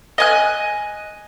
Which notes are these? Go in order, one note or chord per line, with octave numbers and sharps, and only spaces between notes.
D#5 G#5 F#6